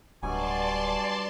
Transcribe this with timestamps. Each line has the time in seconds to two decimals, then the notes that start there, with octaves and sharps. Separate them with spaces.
0.23 D1 G2 B2 F#3 D5 G#5 A5 C6